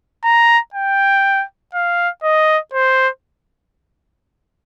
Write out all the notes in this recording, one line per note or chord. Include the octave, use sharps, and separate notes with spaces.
A#5
G5
F5
D#5
C5